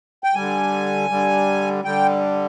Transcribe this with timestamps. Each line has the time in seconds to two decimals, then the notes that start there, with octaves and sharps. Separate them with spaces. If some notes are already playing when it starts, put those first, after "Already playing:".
0.24 G5
0.35 D3 G3 G#5
1.10 D3 G3
1.84 D3 G3 G5